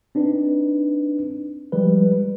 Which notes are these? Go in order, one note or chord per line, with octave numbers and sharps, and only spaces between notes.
C4 D4 D#4 B4
F3 G3 G#3 B4